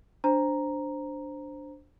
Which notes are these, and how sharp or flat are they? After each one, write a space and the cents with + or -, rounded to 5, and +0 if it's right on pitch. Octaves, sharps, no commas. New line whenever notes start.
D4 +0 C5 +0 A#5 +0